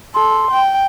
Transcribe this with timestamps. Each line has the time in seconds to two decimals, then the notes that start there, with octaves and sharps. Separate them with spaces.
0.15 A4 C6
0.51 G5